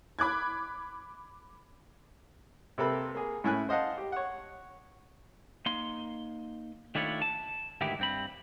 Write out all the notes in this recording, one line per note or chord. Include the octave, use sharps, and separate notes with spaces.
B5 D6 F#6 G#6
C3 A#3 C4 A4 B4 B5
A#3 G#4
A2 C#4 E4 E5 G#5 F#6
C5 D#5 F5 F#5 A5
G4
C#5 F#5
A#3 D#4 C6
D#3 A3 D4 E4 F4 C#5
A5
D2 G#2 D#3 E3 E4 G4
G2 C4 B5